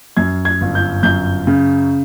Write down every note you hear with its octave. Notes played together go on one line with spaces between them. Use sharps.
F#2 G#6
G#6
G1
G6
F#2 G6
C#3